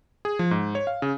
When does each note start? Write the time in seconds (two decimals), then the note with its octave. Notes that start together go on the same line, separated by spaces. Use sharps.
0.25 G#4
0.39 F3
0.51 G#2
0.75 C#5
0.87 F5
1.02 C#3